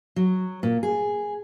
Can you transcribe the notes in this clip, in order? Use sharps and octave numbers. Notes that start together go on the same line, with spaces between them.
F#3
A#2
G#4